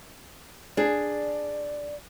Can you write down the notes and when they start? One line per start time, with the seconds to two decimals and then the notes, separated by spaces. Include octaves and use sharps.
0.77 D4 G#4 D5